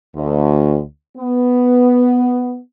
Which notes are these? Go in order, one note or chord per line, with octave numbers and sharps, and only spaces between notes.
D2
B3